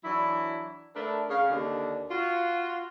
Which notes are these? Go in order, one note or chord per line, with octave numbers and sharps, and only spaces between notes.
E3 F#3 D4 E4
A3 D4 A#4 B4
C#3 F5
D#2 D3 D4
F4 F#4